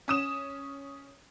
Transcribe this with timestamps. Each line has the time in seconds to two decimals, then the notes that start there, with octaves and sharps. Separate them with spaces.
0.08 C#4 D#6 E7